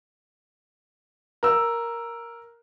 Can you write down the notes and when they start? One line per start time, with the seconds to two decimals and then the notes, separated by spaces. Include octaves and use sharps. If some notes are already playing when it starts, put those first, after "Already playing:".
1.43 A#4 E6